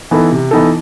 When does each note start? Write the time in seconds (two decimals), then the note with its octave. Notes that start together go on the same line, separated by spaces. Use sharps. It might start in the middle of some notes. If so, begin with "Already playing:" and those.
0.11 E3 B3 D#4 A4
0.32 C3
0.51 E3 B3 D#4 A4